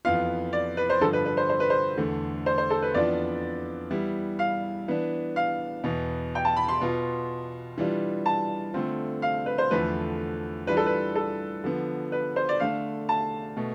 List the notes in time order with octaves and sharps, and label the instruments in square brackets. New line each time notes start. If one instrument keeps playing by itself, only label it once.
[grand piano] F2 E3 B3 F4 [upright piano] F5
[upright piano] D5
B4
C5
[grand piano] G2 D3 F3 [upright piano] A4
[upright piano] B4
B4
C5
C5
B4
C5
[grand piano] E2 D3 A3
[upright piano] C5
C5
A4
B4
[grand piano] F2 E3 B3 D4 F4 [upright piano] D5
[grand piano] E3 G3 B3 E4
[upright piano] F5
[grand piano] E3 B3 D4
[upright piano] F5
[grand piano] E2 B2 B3
[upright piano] G5
A5
B5
C6
[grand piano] B2 B3 F4
E3 G3 D4 F4
[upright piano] A5
[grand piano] D3 A3 C4 F4
[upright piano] F5
B4
C5
[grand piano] E2 D3 F3 A3 [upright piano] B4
[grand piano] E3 G3 D4 F4 [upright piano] B4
[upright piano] A4
B4
A4
[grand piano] D3 F3 B3
[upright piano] B4
C5
D5
[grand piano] D3 A3 D4 [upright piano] F5
[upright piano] A5
[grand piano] B2 A3